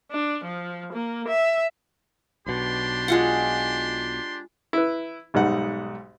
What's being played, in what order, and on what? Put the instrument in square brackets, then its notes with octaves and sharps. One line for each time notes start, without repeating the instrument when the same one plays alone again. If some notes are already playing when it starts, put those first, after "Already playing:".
[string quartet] D4
F3
A#3
E5
[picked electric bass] B1 B2 [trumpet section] D4 G4 C6
[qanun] G#3 F4 F#5
[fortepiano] E4 B4
B1 G#2 G3 D#4 F#5